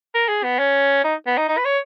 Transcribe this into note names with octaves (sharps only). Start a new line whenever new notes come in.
A#4
G#4
B3
C#4
D#4
B3
D#4
D#4
B4
C#5